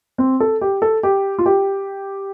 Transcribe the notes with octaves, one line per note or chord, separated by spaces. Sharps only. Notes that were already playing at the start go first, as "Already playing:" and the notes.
C4
A4
G4
A4
G4
F4
G4